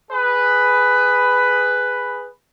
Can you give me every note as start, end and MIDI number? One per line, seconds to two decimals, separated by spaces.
0.11 2.27 68
0.11 2.27 71